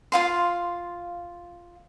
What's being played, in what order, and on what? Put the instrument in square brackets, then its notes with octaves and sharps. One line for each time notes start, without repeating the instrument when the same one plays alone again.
[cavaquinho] F4 F5 C6